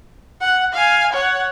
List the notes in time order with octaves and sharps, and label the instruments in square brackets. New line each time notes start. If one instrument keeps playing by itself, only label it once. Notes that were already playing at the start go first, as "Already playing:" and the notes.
[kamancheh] F#5
F5 G#5
C#5 F#5